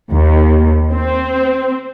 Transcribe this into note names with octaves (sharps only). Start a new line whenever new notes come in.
D#2
C4